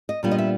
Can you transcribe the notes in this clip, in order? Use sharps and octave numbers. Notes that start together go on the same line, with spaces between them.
D#5
A#2 G3 B3 D4 F4
D#5
E5